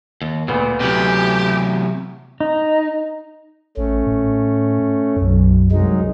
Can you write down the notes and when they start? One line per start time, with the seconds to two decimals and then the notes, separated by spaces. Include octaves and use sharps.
0.22 D#2
0.48 D2 A#2 B3
0.80 E2 A2 C3 F#3 G4
2.40 D#4
3.77 A1 A3 C#4
4.07 A2
5.16 B1 F#2
5.72 C2 F#3 G#3 D#4